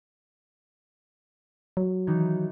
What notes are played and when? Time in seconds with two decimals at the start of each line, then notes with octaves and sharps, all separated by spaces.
1.77 F#3
2.07 D#3 E3 D#4